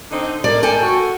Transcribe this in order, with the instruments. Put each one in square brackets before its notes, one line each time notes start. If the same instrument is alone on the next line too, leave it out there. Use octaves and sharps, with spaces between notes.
[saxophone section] D3 C4 D#4
[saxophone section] A2 A#4 [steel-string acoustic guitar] D5
[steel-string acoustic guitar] A4 G5 G#5
[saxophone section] F#4